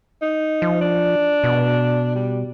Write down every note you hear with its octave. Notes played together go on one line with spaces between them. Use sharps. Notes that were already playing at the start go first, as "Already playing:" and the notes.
D#4
F3
D4
B2
G3